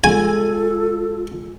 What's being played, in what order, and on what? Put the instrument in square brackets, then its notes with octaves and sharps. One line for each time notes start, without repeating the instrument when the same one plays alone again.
[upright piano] G#3 [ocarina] F4 [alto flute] A4 [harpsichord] G#5